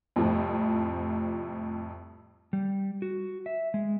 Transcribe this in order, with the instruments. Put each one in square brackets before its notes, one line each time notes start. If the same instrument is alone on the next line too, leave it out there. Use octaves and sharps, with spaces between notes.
[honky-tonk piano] F2 A2 C3 F3 G3
[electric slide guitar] G3
F#4
E5
G#3